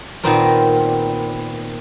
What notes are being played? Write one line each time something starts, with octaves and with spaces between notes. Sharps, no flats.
A#2 D#3 B3 C4 A#4